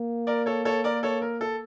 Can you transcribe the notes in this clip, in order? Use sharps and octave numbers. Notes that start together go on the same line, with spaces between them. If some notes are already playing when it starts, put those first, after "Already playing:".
Already playing: A#3
A#4 D5
A4 C#5
A4 C#5
A#4 D5
A4 C#5
A#4
A4